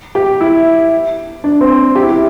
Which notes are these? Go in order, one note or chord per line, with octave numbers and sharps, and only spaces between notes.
G4
E4
D4
C4
G4
E4
G4